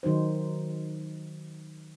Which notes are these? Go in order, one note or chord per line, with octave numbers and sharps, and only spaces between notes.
D#3 F#3 D#4 C5